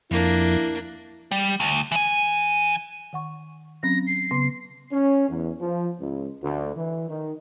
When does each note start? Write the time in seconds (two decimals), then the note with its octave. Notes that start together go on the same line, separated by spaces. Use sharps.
0.11 F2 A#3 D4 E4
1.31 G3
1.60 D2
1.92 E3 G#5
3.13 D#3 F#5 C#6
3.83 F#3 C4 C#4 A#6
4.07 C7
4.31 C#3 B3 C6
4.92 C#4
5.29 E2
5.61 F3
6.00 C#2
6.43 D2
6.76 E3
7.10 D#3